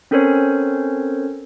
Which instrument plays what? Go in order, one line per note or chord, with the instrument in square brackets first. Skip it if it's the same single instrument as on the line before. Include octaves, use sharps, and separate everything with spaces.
[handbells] C4 C#4 A4 A#4 C5 C#5